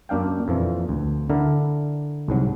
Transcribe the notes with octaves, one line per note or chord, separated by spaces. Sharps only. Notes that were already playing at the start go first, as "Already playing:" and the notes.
F#2 A#3 D4 F5 G5
F2 A#2 E3 F3
D2
D3 D4 E4 A#4
C2 G#2 F#3